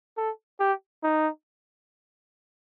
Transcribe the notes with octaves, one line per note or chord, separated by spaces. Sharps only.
A4
G4
D#4